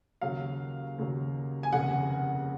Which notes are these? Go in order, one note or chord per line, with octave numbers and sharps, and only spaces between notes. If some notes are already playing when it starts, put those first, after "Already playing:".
D#2 C#3 F#3 F5
D#2 C#3 F#3
G#5
F1 D#2 C#3 F#5